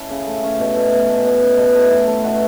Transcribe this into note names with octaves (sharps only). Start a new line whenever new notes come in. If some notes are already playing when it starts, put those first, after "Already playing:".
Already playing: C#4 E4 A4
C#3
A3
C#4
B2
A3
B2
A3
B2
C#4
B2
A3
E4
A3
B2 F#4